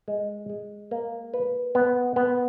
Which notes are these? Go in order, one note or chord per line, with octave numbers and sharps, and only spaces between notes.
G#3
G#3
A#3
B4
B3
B3